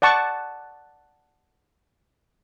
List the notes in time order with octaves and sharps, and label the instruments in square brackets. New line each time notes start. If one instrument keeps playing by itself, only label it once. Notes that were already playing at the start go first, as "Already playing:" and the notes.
[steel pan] D5 F#5 A5 C#6